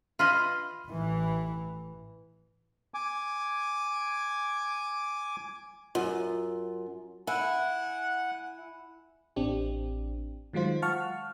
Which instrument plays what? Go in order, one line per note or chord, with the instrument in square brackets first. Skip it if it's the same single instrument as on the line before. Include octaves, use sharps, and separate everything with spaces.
[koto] F4 B4 D#5
[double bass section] A1 E3
[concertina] G#5 D6
[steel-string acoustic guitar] F#2 [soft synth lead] F4
[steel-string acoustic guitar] E4 [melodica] F#5 [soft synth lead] G#5
[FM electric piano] A1 C4 D4 G4
D#3 F#3 G#3 F4 C5
F5 F#5 A5 C#6 F6